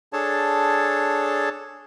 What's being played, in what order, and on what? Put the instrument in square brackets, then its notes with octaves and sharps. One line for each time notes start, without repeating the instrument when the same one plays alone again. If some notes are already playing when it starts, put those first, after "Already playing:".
[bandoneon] D4 G#4 A4 C#5 A5